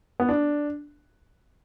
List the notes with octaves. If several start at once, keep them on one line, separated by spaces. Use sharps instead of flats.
B3
D4